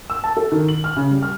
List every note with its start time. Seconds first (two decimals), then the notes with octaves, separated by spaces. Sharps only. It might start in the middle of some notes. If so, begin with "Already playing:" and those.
0.10 E6
0.24 A5
0.37 A4
0.52 D#3
0.69 F#7
0.84 F6
0.96 C#3
1.11 G3
1.22 F6